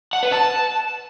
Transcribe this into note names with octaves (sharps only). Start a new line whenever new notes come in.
F#5
B4
A5